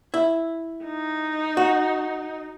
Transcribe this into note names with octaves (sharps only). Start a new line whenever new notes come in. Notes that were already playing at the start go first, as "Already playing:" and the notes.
E4
D#4
F#4